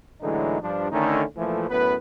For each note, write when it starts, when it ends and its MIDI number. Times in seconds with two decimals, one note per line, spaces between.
0.22 0.58 45
0.22 0.58 50
0.22 0.58 52
0.22 0.58 54
0.22 0.58 56
0.22 0.58 63
0.61 0.87 43
0.61 0.87 53
0.61 0.87 62
0.91 1.23 50
0.91 1.23 51
0.91 1.23 57
0.91 1.23 61
0.91 1.23 63
0.91 1.23 64
1.37 1.68 46
1.37 1.68 52
1.37 1.68 53
1.37 1.68 57
1.69 1.95 42
1.69 1.95 45
1.69 1.95 59
1.69 1.95 71